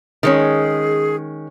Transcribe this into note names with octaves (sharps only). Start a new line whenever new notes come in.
D#3 G#3 C#4 G#4